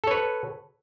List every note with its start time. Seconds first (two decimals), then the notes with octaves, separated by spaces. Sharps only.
0.04 A4
0.07 C#5
0.11 B4